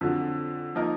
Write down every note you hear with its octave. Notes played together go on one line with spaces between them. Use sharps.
F2 D3 F#3
F3 A#3 D#4 A#4